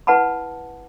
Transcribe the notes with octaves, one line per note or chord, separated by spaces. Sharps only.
E4 B4 F#5 A5 B5